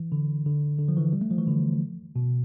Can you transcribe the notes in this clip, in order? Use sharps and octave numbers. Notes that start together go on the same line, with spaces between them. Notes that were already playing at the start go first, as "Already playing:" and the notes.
Already playing: E3
D3
D3
D3
F3
E3
G3
A3
F3
E3
D3
B2